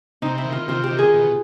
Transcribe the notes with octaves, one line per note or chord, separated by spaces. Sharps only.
C3 D#4
E4
D#3
F4
C3 F4
G4
D#3
G#4
B2